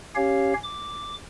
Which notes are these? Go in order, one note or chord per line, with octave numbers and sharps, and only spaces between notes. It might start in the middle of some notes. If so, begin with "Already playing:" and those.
C#4 G4 C#5 F5
D6